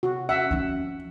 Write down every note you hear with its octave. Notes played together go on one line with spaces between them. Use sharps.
C3 F#4
C#4 E5 F#5
F3 C4